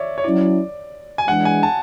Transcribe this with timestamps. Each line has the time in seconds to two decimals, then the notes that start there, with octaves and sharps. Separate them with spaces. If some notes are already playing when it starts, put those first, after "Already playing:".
Already playing: C#5 D5 E5
0.18 C#5
0.24 F#3 C#4 E4 D5
1.18 G#5
1.28 E3 G#3 D4 F#5
1.45 G#5
1.63 A5